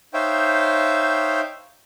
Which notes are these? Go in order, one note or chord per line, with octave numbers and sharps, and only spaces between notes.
D#4 C5 C#5 E5 F5 G5